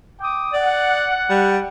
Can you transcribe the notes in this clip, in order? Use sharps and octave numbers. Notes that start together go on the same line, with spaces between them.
G5 D6 D#6
D5 F#5
G3